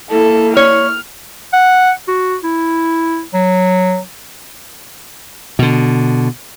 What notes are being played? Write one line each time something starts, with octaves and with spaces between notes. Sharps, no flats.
A#3 E4 A4
C#5 F6
F#5
F#4
E4
F#3
B2 D3